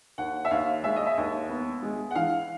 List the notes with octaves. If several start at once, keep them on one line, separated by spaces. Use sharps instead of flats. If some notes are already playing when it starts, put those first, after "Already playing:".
D#2 F#5
E5
D#2 F5
G#3 E5
D#5
E5
D#2
B3
G#3
F#5
E3 F5